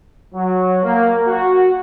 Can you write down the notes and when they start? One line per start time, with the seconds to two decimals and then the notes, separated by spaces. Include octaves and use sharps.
0.35 F#3
0.84 A#3
1.28 F#4